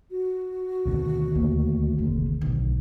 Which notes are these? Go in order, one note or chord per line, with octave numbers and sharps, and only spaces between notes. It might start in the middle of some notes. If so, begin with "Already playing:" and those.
F#4
D2 B2 D#3
D#2 A3
F#1 C3
B1